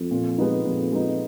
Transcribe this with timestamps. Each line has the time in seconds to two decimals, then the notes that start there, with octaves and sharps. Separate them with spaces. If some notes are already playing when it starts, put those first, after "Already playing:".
Already playing: F2
0.11 A#2
0.38 G#3 B3 D#4
0.65 F2 A#2
0.92 G#3 B3 D#4